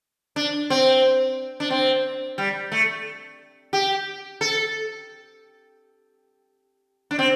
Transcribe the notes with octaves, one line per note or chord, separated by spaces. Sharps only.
D4
C4
D4
C4
G3
A3
G4
A4
D4
C4